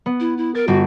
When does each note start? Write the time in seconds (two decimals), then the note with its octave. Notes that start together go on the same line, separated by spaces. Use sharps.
0.06 B3
0.20 E4
0.37 E4
0.55 A#4 A6 D7
0.68 G1 F#4